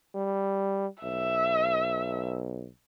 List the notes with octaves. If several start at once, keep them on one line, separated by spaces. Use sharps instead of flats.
G3
B1 E5